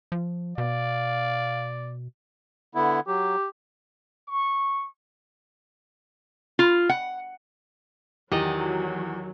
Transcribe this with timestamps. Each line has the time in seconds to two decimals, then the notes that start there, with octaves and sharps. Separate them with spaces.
0.12 F3
0.58 B2 D5 F5
2.75 D3 B3 E4
3.07 F#3 G4
4.28 C#6
6.59 F4
6.89 F#5
8.32 E2 D#3 F#3 G4 D5 D#5